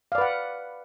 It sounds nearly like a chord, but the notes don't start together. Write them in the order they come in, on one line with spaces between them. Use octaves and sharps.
F5 D5 B4 F#5